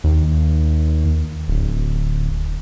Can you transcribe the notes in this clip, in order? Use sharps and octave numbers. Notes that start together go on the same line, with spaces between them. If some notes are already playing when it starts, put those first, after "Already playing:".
D#2
D1